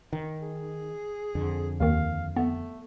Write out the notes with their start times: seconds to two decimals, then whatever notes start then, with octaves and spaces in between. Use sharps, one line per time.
0.13 D#3
0.42 G#4
1.35 F2 D3
1.80 D#2 D#3 F5
2.36 A3 B3